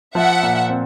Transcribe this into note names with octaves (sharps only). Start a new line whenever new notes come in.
F3 E5 F#5
A#2
C4